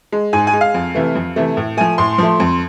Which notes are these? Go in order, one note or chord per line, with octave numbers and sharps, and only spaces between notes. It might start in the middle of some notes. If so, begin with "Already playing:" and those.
G#3
G#2 G#5
G#5
G#3
F5
F2
C3 E3 A3
F2
C3 E3 A3
A2
F3 A3 G#5
A2 C6
F3 A3
F2